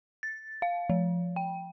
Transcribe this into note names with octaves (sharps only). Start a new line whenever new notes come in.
A6
F5
F3
G5